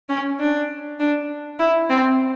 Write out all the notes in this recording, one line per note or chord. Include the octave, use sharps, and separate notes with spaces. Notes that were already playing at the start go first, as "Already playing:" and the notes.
C#4
D4
D4
E4
C4